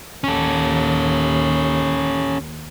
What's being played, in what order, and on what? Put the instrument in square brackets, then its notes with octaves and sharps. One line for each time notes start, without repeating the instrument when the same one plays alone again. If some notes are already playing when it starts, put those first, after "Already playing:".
[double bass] D#2 [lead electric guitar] C#4 A4